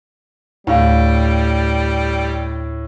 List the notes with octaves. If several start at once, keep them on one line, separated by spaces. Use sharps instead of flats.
D2 A2 G3 F5